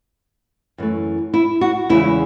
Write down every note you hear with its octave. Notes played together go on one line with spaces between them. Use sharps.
F#2 E3 A3
E4
F#4
E2 C#3 E3 G#3 E4